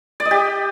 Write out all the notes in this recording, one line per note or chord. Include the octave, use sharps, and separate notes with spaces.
D5
D#5
G4